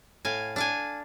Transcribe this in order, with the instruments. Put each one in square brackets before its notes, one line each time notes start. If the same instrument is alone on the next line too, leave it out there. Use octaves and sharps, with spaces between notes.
[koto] A2 F5 G#5
D4 F5 G#5